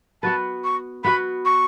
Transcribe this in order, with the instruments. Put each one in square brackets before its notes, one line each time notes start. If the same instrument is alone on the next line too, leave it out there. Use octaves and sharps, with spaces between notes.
[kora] B3 F#4 B4 [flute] A5
[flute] C#6
[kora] B3 F#4 B4 [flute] B5
[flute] C#6